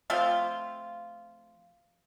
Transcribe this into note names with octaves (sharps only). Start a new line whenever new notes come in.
F3 A3 C4 F4